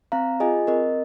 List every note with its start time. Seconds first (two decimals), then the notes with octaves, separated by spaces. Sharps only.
0.12 C4 F5 A#5
0.40 F4 G#4 D#5 G#5
0.67 C4 A#4 D#5